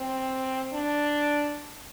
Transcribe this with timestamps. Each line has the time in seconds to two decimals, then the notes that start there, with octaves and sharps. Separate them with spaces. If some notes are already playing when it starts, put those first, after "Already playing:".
Already playing: C4
0.73 D4